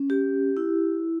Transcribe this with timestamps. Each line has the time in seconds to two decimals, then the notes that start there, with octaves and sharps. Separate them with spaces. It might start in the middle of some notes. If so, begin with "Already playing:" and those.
Already playing: C#4
0.10 G4
0.57 E4